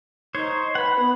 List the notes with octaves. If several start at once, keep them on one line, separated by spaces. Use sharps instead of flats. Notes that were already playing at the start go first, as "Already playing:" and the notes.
D#4 C5 C#5
B4 F#5 B5
B3